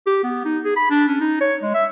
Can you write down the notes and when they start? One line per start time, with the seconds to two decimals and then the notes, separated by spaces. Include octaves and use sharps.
0.07 G4
0.24 B3
0.45 D#4
0.65 G#4
0.77 B5
0.91 D4
1.08 C#4
1.21 D#4
1.41 C#5
1.63 G#3
1.75 E5